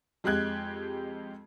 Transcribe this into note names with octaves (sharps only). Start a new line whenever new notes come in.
F2 G#3 G4 F#6 G#6